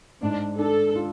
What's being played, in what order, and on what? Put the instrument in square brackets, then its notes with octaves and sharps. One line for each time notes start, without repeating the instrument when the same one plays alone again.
[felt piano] G#2 [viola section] D4
[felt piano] D4 [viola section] A4
[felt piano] F4